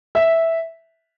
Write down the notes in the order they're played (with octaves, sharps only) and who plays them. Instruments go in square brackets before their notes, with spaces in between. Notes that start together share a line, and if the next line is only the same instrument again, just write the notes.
[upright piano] E5